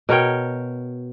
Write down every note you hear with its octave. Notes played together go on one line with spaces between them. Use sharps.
B2 A#4 C#5 G5